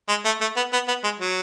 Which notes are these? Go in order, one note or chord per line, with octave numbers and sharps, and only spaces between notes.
G#3
A3
A3
B3
B3
B3
G#3
F#3